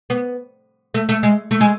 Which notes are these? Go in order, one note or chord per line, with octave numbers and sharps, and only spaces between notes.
B3
A3
A3
G#3
A3
G#3